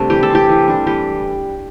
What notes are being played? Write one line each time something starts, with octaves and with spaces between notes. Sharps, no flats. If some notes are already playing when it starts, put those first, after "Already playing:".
Already playing: C3 G3 A3 D4
E3 G4
A4
C4 E4 G4
E3
G3 D4
E3 G4